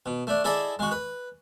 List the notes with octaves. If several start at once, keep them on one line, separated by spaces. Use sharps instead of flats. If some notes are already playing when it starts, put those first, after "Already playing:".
B2
A3 D4
E4 G#4 A4 D5 D#5
G#3 F#4
B4